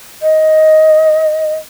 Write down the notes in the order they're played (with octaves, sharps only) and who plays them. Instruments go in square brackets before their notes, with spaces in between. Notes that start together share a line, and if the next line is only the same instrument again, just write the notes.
[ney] D#5